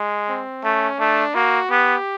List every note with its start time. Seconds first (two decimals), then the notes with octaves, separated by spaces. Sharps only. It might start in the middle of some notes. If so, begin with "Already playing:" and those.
Already playing: G#3
0.29 C4
0.64 A3 C#4
0.99 A3 D4
1.35 A#3 F#4
1.71 B3 G4